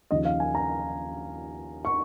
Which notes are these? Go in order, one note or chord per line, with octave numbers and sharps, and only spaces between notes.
D#2 C#3 F3 D#5
F5
G#5
A#5
C#6